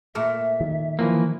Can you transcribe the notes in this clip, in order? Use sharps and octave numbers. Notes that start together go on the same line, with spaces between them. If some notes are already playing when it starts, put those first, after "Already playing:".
A#2 A3 A#4 E5
D#3
E3 F3 A#3